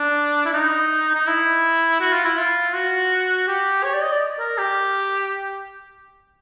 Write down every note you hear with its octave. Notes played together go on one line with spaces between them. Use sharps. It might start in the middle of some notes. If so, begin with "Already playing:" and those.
Already playing: D4
E4
D#4
D#4
E4
F#4
F4
E4
F4
F#4
G4
C#5
D5
D#5
D5
A#4
G4